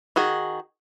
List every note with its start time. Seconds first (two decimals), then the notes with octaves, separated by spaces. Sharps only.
0.16 D#3 F#4 G#4